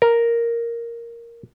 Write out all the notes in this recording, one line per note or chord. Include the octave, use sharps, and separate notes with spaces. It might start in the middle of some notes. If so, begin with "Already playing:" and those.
A#4